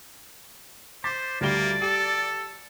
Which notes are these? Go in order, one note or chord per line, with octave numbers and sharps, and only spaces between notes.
C5 D6 A6 B6
D2 G3 A#3 D5 G7
G4 A4